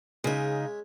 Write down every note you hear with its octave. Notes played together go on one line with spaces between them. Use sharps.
C#3 G#3 C#4 D#4 E5